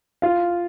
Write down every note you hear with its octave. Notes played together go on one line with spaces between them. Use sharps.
F4 F5